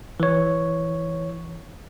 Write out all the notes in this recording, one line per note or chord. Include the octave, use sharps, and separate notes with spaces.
E3 C#5